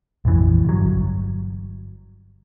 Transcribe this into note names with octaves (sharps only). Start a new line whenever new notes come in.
A#1 F2 E3
G1 F#3